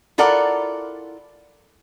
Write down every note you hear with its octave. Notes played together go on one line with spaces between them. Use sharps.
E4 F4 A4 A#4 D5 F#5